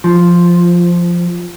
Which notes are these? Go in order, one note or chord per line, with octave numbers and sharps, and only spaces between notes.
F3